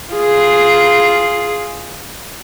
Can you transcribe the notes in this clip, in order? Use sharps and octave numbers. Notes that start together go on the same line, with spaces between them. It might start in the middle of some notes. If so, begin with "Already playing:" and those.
F4 G#4